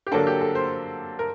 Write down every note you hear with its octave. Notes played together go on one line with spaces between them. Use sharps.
G4
D3 F#3 A#3 D4 A4
G4
A4
C5
A#4